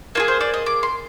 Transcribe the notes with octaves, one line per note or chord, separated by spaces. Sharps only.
A#3 F4 G#4 G#5
C5
D5
D#5
D6
C6